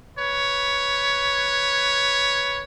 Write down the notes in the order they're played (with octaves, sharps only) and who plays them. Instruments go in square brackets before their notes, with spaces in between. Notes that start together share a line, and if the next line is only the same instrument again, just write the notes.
[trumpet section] B4 C#5